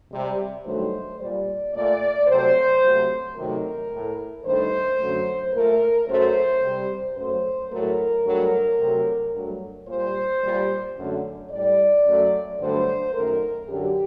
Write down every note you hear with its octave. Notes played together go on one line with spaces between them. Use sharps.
C3 G3
G2 D#3 F#3 A3 C5
A#2 G3 D5
A#2 A3 D5
C3 F#3 A3 C5
C3 F#3 A3
C3 D#3 F#3 A3 A#4
A2 A3
G2 D#3 A3 C5
F#2 D3 F#3 A3
A#2 A3 A#4
F#2 F#3 A3 C5
C3 G3
F#2 F#3 A3 C5
A2 F#3 A3 A#4
G2 F#3 A3
C3 F#3 A3
G2 F#3 A3
A#2 G3 C5
A#2 G3
F#2 D3 F#3 A3
A2 G3 D5
F#2 F#3 A3
G2 D3 F#3 A3 C5
F#2 D#3 A3 A#4
F#2 D3 F#3 G4